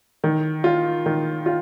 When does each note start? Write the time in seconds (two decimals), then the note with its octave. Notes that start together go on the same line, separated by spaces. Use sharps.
0.24 D#3
0.64 F4
1.06 D#3
1.46 F4